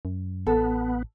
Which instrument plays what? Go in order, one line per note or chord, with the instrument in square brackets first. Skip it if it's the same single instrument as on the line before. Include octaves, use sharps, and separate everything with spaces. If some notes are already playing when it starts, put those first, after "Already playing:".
[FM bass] F#2
[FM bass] A1 [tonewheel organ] B3 [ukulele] A4